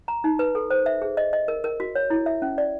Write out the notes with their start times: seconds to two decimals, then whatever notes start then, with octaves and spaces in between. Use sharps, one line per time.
0.08 A#5
0.24 D#4
0.39 B4
0.55 A4
0.71 C5
0.86 E5
1.02 G#4
1.17 D#5
1.33 D#5
1.48 A#4
1.64 A#4
1.80 F#4
1.95 C#5
2.10 E4
2.26 E5
2.42 C#4
2.58 D5